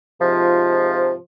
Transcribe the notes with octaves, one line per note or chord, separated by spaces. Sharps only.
G#2 C3 F3